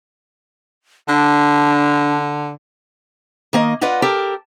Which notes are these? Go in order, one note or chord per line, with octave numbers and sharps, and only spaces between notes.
D3 D4
D#3 A#3 D#5
F4 B4 D5 D#5 F#5
G4 A4 A#4